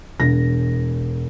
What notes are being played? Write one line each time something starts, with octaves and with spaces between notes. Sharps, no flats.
E1 A#6